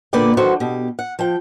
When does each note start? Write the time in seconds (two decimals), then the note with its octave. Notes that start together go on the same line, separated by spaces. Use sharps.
0.13 A#2 D3 A#3 B4 D5 G5
0.37 D#3 E3 F#3 F#4 A4 C5
0.60 B2 G4
0.99 F#5
1.19 F3 G5